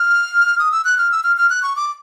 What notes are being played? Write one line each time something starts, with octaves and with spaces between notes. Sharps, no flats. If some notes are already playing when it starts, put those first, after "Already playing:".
Already playing: F6
D#6
E6
F#6
F6
E6
F6
F6
F#6
C#6
D6